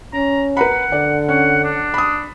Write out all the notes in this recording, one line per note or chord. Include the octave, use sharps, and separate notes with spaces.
C#4 A#5
B4 F#5 A#5 B5
D3 D5
C#4 F#5
D4
B5 D#6